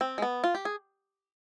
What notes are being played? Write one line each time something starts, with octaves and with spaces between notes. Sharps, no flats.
C4
G#3
B3
F4
G4
G#4